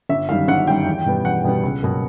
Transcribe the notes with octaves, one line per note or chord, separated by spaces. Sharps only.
G1 E5
F#2 D#3 G3 F5
G1 F#5
F#2 D#3 G3 G5
E2
B2 G3 B3
E2 F#5
B2 G3 B3
C#2
B2 F#3 A#3